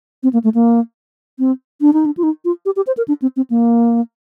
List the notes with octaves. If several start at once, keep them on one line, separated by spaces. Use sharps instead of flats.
C4
A#3
A3
A#3
C4
D4
D#4
D4
F4
D#4
F4
G4
G4
C5
A#4
D4
C4
C4
A#3